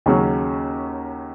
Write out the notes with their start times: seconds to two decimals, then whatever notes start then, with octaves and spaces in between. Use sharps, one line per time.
0.06 D#2 C#3 F#3 C#4